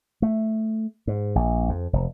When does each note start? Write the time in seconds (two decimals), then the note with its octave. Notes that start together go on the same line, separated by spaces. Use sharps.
0.22 A3
1.07 G#2
1.35 A#1
1.69 F2
1.93 F1